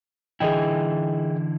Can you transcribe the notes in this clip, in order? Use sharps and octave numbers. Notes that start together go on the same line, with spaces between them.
D3 E3 E4 G#4 D#5 G5